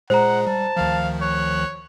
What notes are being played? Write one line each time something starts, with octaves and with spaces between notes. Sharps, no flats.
A#2 G#3 G#4 C5 F#5 A#5
G3 A5
D2 D#3 F3 F5
C#5 F#6